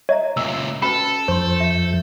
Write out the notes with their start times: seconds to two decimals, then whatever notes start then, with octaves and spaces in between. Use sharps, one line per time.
0.09 C#5 D#5 E5 A#5
0.37 C#2 A#2 E6
0.82 C#4 F#4 A4 B4 B5
1.28 F2 F3 C5 C6 C#6 G6
1.60 E5